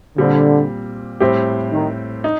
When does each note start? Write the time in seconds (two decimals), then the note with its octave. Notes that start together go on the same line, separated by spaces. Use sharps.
0.17 A#2 D3 G3 C4
1.20 A2 G3 C4 G4
1.72 D#3
2.24 D#4